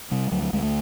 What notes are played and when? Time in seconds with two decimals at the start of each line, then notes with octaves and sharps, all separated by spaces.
0.11 C3 G3
0.31 D2 F#3
0.43 F#3
0.53 D2 G#3
0.62 A3